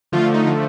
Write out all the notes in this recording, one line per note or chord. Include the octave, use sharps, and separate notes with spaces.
D3 F3 A3 F4
D#4